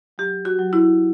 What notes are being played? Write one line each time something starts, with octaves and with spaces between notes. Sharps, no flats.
F#3 G4
F#4
F#3
E4